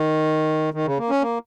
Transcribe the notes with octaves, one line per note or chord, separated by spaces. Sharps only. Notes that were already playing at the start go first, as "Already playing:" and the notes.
Already playing: D#3
D#3
C#3
A#3
C#4
A#3